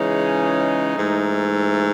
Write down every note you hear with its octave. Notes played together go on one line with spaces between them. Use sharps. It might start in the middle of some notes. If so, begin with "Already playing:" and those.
Already playing: C#3 E3 G#3 C#4 D#4
G#2 E3 A3